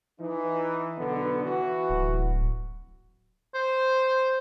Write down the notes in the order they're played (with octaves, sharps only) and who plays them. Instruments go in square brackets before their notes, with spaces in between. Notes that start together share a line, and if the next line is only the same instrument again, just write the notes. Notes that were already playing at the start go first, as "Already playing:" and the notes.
[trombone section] E3 D#4
B1 D3 B3
E3 F#4
[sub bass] D1
[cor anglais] C5